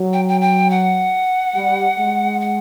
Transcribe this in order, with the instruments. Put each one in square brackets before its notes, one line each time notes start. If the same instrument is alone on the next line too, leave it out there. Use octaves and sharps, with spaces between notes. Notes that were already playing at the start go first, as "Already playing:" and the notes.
Already playing: [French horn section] F#3
[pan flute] G5
G5
G5
F#5
[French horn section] G3
G#3
[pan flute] F#5